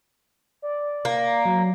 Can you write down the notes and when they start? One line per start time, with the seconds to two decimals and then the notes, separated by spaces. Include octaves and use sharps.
0.62 D5
1.05 A#3
1.45 F#3